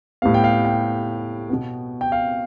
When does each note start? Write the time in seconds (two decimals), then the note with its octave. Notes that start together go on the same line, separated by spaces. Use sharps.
0.22 A2 G3 B3 F5
0.34 G5
0.44 F5
0.65 G5
1.49 B2 B3
2.01 G5
2.12 F5